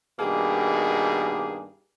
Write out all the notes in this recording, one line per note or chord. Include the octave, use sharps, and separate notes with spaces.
G2 B2 D#3 A#3 G4 G#4